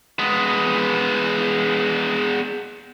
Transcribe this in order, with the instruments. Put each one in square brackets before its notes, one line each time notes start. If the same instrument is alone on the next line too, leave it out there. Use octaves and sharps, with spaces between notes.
[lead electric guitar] G#3 B3